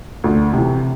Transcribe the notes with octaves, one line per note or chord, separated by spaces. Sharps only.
D2
C3 E3